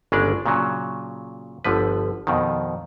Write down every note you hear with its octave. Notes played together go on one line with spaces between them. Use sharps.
G1 C#3 G#3 D4 D5
A#2 C#3 F#3
G1 D3 F3 B4
F2 B2 D#3